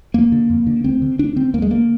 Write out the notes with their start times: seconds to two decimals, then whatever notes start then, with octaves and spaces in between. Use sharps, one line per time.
0.14 F2 A#3
0.32 D3
0.50 F2
0.67 D3
0.84 D2 C4
1.02 D3
1.19 D2 D4
1.36 D3 C4
1.54 D#2 A#3
1.62 G#3
1.70 D3 A#3